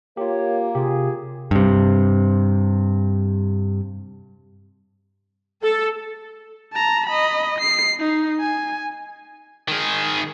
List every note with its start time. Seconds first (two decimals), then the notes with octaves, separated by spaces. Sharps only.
0.17 A#3 F4 G4 C#5
0.75 C3 F4 G4 G#4
1.51 G2 C3
5.63 A4
6.73 A5 A#5
7.07 D#5 B5
7.59 C7
8.00 D#4
8.40 G#5
9.68 D#3 G#4